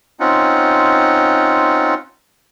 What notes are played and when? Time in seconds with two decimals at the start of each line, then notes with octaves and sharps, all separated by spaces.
0.20 C4 C#4 D#4 F4 F#5